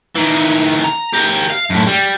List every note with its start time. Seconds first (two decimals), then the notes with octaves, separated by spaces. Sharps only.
0.15 D#3 E3
0.84 A#5
1.14 G4 A#4
1.50 F5
1.70 F#2 A2
1.87 G3